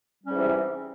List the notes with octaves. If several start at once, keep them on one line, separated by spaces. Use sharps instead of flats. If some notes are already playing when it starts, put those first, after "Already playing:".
G#2 C3 E3 G3 C#4